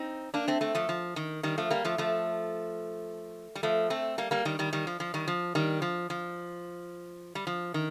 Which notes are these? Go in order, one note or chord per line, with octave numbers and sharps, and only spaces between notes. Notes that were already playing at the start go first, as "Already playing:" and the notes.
Already playing: C4 D#4
A#3 D4
A3 C4
A3 C4
F3 A3
F3
D#3
D#3 G3
F3 A3
G3 A#3
F3 A3
F3 A3
G3
F3 A3
A3 C4
G3 A#3
G3 A#3
D#3 G3
D#3 G3
D#3 G3
F3
F3
D#3 G3
F3
D#3 G3
F3
F3
G3
F3
D#3